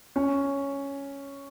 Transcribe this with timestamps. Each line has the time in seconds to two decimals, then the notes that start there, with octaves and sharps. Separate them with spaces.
0.16 C#4